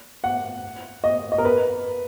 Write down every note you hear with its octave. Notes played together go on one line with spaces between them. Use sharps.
F#5
D#5
D#5
A#4
B4